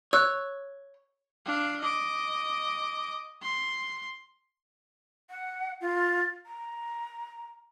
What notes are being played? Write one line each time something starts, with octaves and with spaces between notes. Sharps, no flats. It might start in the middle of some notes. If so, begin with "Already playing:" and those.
C#5 E6 F#6
D4 F5
D#5 D6
C6
F#5
F4
A#5